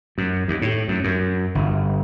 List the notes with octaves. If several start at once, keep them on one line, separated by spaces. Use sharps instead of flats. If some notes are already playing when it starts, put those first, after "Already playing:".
F#2
D#2
A2
F#2
F#2
G1